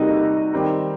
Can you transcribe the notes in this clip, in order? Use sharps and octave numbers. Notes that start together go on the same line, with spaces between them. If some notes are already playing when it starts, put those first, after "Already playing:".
Already playing: C3 G3 A#3 D#4 F#4 A4
D#3 G3 C4